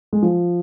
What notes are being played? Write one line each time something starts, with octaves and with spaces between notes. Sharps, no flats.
G#3
F3